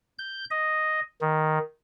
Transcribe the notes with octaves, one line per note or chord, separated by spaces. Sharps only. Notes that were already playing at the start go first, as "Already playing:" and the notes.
G6
D#5
D#3